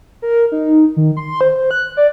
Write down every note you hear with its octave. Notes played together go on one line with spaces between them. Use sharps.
A#4
D#4
D#3
C6
C5
F#6
D5